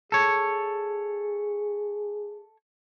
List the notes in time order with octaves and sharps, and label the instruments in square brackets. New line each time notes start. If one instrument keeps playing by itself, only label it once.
[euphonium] G#4 [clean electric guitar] A4 C#5